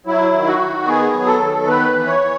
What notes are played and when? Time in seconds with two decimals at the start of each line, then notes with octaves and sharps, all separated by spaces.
0.06 F#3 E4
0.33 D#3
0.47 F#4
0.60 D#3
0.87 B3 G#4
1.14 F#3
1.27 A4
1.40 D#3
1.67 B3 B4
1.94 E3
2.07 C#5
2.21 E3